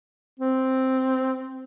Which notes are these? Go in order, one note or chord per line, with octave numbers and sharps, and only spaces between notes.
C4